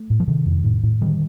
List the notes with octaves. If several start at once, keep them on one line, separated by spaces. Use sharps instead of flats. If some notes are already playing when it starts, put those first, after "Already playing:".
Already playing: A3
A2
F3
C3 D#3
F2
A2
A2
D3 D#3 G3